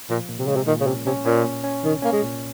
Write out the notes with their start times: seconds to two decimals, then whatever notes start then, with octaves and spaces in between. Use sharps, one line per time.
0.10 A#2 F3
0.29 A#2
0.39 C3
0.47 C#3 G#3
0.56 C3
0.67 A#2 D#3
0.81 C#3
0.87 C3 C#4
1.06 C3 C#4
1.26 A#2 C#4
1.45 A#2
1.64 C#4
1.83 C2 D#3
2.02 A#3 C#4
2.13 G#3
2.22 A#2